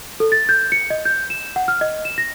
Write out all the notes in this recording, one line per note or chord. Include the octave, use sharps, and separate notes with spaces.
A4
A6
G6
C#7
D#5
G6
E7
F#5
F6
D#5
E7
A#6